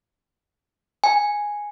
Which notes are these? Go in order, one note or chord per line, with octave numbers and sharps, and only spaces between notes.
G#5